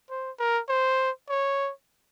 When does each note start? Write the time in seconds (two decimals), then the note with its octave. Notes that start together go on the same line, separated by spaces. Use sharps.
0.10 C5
0.39 A#4
0.69 C5
1.29 C#5